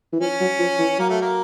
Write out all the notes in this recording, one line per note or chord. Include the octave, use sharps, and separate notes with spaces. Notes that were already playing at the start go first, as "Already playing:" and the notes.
E3
F3 C#4
F#3
F3
E3
F#3 A#3
A3
A#3